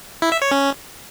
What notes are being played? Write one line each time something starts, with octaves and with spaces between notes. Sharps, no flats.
E4
E5
C#5
C#4